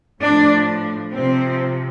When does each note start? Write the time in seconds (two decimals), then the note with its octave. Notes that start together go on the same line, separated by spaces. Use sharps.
0.20 A2 F3 D4
1.12 C3 F3 C4